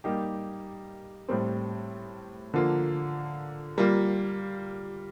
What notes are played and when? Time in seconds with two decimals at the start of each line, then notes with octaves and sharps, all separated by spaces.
0.04 G3 A#3 D#4 G4
1.28 A2 G3 C4
2.54 D3 F3 A#3 F4
3.78 G3 A#3 F4